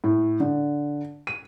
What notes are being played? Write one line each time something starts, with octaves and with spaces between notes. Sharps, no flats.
A2
D3
D#7